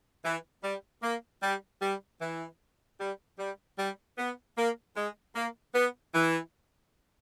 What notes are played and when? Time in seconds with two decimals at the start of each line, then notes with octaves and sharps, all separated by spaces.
0.25 E3
0.64 G3
1.03 A#3
1.43 G3
1.82 G3
2.21 E3
3.00 G3
3.39 G3
3.78 G3
4.18 B3
4.58 A#3
4.97 G#3
5.36 A#3
5.75 B3
6.14 E3